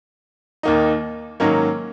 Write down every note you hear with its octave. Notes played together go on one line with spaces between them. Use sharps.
D#2 D#3 A#3 D#4
G#2 D#3 F#3 A#3 C#4